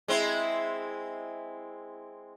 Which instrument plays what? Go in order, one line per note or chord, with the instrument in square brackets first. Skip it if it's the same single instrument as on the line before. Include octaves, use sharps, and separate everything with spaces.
[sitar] G#3 C4 E4